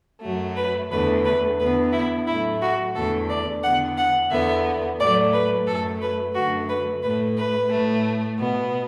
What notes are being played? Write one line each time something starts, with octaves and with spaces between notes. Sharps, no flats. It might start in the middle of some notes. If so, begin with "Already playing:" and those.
F#2 F#3 A3
B4
E2 D3 A3 B4
B4
E2 D3 B3 B4
E4
A2 F#3 A3 E4
F#4
E2 D3 A3 A4
D5
E2 D3 B3 F#5
F#5
E2 D3 B3 E5
A2 F#3 A3 D5
B4
F#2 F#3 A3 A4
B4
F#2 D3 F#3 A3 F#4
B4
A2 A3 B4
B4
A2 A3
B2 B3